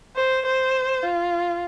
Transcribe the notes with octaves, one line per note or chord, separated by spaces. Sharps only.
C5
C5
F4